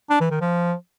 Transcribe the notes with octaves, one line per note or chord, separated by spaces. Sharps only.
D4
E3
D#3
F3